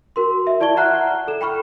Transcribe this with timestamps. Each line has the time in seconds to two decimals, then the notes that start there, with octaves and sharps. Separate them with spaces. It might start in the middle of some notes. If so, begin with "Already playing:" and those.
0.16 F#4 A#4 C6
0.47 D#5 E5
0.60 E4 D5 A5 C#6 G#6 G7
0.77 E5 F#5 A#5 F6 F#6 C7
1.28 A4 E7
1.41 G5 B5 C#6 F6